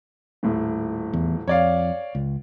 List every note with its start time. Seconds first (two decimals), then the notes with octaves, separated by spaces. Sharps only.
0.43 D#1 A2
1.13 E2
1.48 F2 C#5 D5 F5
2.15 C#2